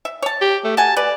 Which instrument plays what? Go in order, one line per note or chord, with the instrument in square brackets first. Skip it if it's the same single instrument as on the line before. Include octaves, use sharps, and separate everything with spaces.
[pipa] E5
C#5 A5
[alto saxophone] G4
A3
[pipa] F#4 G#5 [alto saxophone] A5
[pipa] B4 [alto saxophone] D5